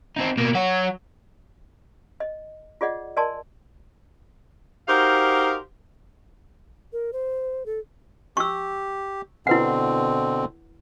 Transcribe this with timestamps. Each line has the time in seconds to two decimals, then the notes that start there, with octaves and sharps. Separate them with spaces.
0.16 C4 D#4
0.37 B2 A#3
0.55 F#3 F#4
2.20 D#5
2.81 F4 G#4 D5 D#5 F#5
3.17 A#4 D5 D#5 G#5 A5 C6
4.88 D#4 F#4 G4 A#4 C5 F5
6.93 A#4
7.13 C5
7.66 A4
8.37 G4 C#6 E6
9.47 B2 D3 C4 E4 B4 F#5